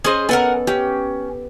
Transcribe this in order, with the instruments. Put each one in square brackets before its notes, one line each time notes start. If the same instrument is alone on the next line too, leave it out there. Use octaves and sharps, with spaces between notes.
[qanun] C#4 D#5 [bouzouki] G#4 C5
[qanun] B3 A4 [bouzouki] A#4 F#5 G#5
[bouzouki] C#4 [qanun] G4